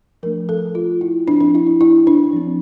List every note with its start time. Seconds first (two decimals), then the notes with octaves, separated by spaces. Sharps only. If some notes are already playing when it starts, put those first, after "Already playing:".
0.23 F3 A3 D4 A#4
0.49 A4
0.75 F4
1.01 E4
1.28 F3 C4 D4
1.40 D4
1.55 E4
1.67 E4
1.81 E4
2.07 D4
2.33 F3 C4